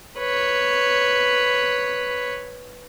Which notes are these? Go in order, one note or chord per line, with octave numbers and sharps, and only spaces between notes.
B4 C#5